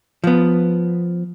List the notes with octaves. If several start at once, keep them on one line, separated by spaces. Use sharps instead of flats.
F3 B3